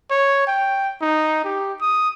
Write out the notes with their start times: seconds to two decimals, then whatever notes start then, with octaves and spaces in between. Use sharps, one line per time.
0.10 C#5
0.47 G5
1.01 D#4
1.44 G4
1.81 D#6